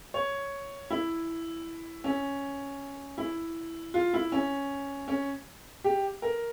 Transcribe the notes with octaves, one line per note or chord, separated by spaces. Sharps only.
C#5
E4
C#4
E4
F4
E4
C#4
C#4
G4
A#4